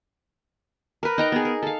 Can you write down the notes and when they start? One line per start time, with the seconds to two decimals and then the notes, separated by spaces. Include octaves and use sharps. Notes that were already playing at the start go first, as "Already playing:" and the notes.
1.03 A#4 B4
1.18 D#4 G5 A#5
1.32 B3 G#4
1.45 A#4
1.63 A4 F5